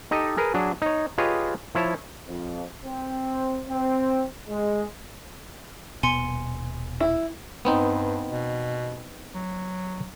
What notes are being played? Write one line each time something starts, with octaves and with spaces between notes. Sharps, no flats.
D#4 G4 A4 D#5
G#4 A#4 B4
F#3 D4 G#4
D#4 C#5
F4 G4 G#4 B4 C#5 D#5
F3 E4 C#5 A5
F2
C4
C4
G#3
D#1 B2 B3 G#5 C6 C#7
E4
G2 B3 C4 D#4
B2
F#3